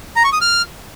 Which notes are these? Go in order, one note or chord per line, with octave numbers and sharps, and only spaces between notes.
A#5
C#6
D#6
F6